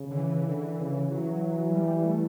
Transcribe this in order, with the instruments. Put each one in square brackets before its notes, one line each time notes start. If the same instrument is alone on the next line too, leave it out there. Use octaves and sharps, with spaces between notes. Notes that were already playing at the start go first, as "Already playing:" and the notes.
Already playing: [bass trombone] C#3
[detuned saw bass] D3
E3
[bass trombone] D3
C#3
[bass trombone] E3 [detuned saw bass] F#3
[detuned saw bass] G3
A3